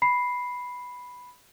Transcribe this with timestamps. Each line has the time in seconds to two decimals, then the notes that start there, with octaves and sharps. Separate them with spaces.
0.02 B5 C7